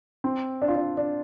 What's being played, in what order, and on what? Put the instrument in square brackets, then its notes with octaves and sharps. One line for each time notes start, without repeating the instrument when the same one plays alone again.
[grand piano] C4
D4
F4
D4
D4